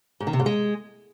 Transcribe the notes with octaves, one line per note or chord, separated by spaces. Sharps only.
G#2
D#3
C3
G#2
G#3